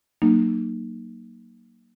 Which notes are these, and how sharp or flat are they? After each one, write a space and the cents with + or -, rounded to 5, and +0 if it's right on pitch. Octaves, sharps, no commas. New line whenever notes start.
F#3 +25 A#3 +0 D#4 -25